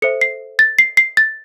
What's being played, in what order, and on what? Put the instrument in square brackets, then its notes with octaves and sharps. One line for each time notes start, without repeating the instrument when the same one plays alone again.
[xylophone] A4 C5 E5 C#7
C7
A6
C7
C7
A6